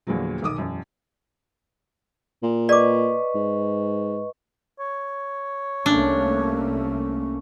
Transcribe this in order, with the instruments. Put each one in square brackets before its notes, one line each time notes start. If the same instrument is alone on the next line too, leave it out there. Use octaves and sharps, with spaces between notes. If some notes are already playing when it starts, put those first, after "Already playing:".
[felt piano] E2 A#2 D3 F3 F#3
B1 D#3 D6 D#6
E1 F#2
[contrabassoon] A#2
[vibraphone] B4 D#5 C#6 [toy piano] D5 D6
[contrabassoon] G#2
[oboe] C#5
[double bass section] C2 A3 A#3 [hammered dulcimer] C#4 [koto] D4